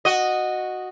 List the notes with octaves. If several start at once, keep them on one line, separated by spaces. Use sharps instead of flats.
F#4 D#5